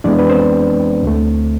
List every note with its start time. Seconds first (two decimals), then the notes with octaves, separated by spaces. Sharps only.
0.04 F2 E3 G#3 B3 D4 D5
0.19 B4
0.29 C4 C5
1.03 D2 D3 A3